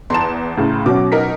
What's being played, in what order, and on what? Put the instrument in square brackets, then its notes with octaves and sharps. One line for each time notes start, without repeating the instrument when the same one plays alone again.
[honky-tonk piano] E2 E7 [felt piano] A5 A#5 C6
[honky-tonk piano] A2 C#3
[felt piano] B2 F#3 C#4 [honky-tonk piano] D6
[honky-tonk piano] D#4 A#4 B6